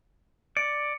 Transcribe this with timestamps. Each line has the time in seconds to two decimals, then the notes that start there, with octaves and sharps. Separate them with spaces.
0.57 D5 C#7